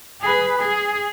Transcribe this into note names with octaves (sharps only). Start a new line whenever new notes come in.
G#4 B4
G#4